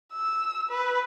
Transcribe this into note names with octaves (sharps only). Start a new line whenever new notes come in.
E6
B4